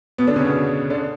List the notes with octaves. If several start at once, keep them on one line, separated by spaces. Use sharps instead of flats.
B2 B3
D3 D4
C#3 C#4
B2 B3
D3 D4